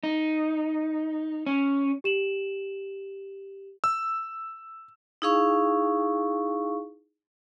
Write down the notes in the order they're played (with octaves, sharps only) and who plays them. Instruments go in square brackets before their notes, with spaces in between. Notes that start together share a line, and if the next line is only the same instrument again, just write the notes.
[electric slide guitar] D#4
C#4
[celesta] G4 E7 F#7
[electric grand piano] E6
[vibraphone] D#4 E4 G#4 F5 C#6